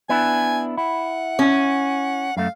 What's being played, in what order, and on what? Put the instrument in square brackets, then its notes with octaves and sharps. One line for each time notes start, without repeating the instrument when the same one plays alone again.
[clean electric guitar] B3 D4 E4 [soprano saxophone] G#5
[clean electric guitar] E4 [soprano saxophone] F#5
[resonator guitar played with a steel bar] C#4
[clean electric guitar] F#2 A3 [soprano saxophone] F5